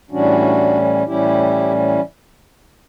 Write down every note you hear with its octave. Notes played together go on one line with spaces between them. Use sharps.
A2 E3 G3 C#4 D4 F#4
A2 E3 G3 C#4 E4 G4